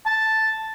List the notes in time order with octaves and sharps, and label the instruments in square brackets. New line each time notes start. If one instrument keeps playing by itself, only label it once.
[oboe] A5